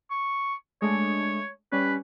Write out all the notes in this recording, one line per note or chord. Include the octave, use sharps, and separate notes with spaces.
C#6
G#3 A3 D4 C#5
G3 C#4 B4